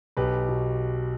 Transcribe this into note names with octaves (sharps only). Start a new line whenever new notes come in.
B1 G4 B4
B2